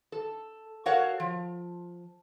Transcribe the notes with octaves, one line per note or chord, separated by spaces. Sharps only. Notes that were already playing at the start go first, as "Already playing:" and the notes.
A4
F#4 A4 A#4 C#5 F5 F#5
F3